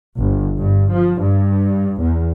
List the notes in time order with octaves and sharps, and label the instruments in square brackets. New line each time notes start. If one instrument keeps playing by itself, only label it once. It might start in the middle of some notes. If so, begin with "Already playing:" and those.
[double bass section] G1
G2
F3
G2
E2